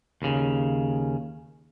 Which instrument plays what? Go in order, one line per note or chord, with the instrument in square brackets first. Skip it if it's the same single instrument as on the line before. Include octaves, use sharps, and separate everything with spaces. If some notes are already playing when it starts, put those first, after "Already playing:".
[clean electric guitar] D#2 C#3